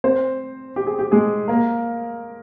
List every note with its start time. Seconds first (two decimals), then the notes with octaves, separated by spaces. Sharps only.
0.04 C4 C5
0.76 G4
0.87 G#4
0.99 G4
1.12 G#3 G#4
1.48 A#3 A#4